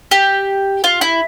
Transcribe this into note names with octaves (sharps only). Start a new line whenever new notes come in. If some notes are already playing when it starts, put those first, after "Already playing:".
G4
F4
E4